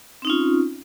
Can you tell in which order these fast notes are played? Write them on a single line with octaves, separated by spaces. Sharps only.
C4 D#4 C#4 F4